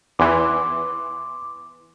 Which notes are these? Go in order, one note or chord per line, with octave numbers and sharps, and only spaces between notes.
E2 E3 C6 D6